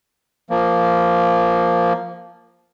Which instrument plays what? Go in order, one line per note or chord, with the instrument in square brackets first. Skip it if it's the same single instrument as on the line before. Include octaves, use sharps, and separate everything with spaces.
[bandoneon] F3 A#3